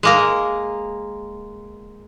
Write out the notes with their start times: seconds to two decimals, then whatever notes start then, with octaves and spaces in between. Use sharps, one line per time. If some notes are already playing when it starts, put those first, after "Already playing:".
0.03 G#3 A#3 A#4